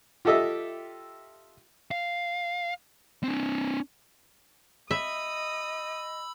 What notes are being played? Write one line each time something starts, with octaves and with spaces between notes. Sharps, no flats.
F4 G4 A4 D#5 E5
F5
C4 D4
D#5 E5 B5 D#6 E6